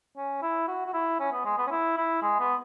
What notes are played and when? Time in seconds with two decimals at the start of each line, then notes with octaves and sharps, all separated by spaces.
0.17 C#4
0.43 E4
0.68 F#4
0.86 F#4
0.94 E4
1.20 C#4
1.32 B3
1.45 G#3
1.58 B3
1.67 C#4
1.71 E4
1.97 E4
2.22 G#3
2.40 B3